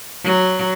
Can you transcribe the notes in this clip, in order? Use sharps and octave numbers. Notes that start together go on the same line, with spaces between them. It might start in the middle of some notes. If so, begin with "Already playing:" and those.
F#3